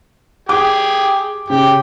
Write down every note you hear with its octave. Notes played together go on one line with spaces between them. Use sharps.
G4 G#4 D6
C#3 G4